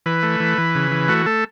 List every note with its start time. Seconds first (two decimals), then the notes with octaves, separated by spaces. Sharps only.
0.06 E3 B4
0.23 A3
0.40 E3
0.58 E3
0.75 C#3
0.91 E3
1.08 A3 F#4
1.26 A3 A4